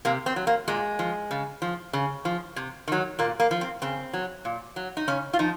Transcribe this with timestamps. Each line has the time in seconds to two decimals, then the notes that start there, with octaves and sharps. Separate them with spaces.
0.05 C3 A#3
0.26 C4
0.36 F#3
0.47 A#3
0.68 A#2 G#3
0.99 F3
1.31 C#3
1.62 F3
1.93 C#3
2.25 F3
2.56 C3
2.88 D#3 F#3
3.19 A#2 A#3
3.40 A#3
3.51 F3
3.61 C4
3.82 C#3 C4
4.13 F#3
4.45 A#2
4.76 F#3
4.97 D#4
5.08 C#3 C#4
5.33 F4
5.39 F3 D#4